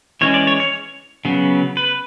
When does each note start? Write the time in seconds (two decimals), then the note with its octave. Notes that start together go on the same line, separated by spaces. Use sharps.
0.21 E3 G#3 C#4 C#5
0.34 D5
0.47 C#5
0.60 C#5
1.25 C#3 F#3 B3
1.77 B4